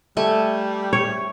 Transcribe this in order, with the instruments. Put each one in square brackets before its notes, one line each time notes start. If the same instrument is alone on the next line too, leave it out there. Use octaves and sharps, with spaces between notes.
[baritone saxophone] G3 [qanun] A3 G#5 C#6
[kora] C#5